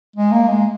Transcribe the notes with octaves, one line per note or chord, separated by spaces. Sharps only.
G#3
A#3
G#3